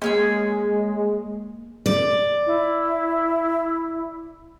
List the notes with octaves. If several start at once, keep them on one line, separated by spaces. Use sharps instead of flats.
G#3 A#3 C#4 G#4 E6
D5
E4